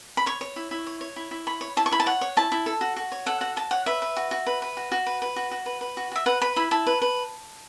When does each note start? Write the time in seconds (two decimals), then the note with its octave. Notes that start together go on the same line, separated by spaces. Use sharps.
0.17 B5
0.26 C#5 C#6
0.41 C#5
0.56 E4
0.71 E4
0.87 C#5
1.01 C#5
1.16 E4
1.31 E4
1.47 C#5 B5
1.61 C#5
1.77 E4 A5
1.86 C#6
1.91 E4 B5
2.00 A5
2.06 C#5 F#5
2.21 C#5
2.37 E4 A5
2.52 E4
2.66 A4
2.81 F#4
2.96 F#4
3.12 C#5
3.26 A4 F#5
3.41 F#4 F#5
3.56 F#4 A5
3.71 C#5 F#5
3.86 B4 E5
4.02 B4
4.17 F#4
4.31 F#4
4.47 B4
4.62 B4
4.77 F#4
4.92 F#4
5.06 B4
5.22 B4
5.36 F#4
5.51 F#4
5.66 B4
5.81 B4
5.97 F#4
6.12 F#4 E5
6.26 B4 F#5
6.41 B4 B5
6.56 E4 B5
6.71 E4 A5
6.87 B4
7.02 B4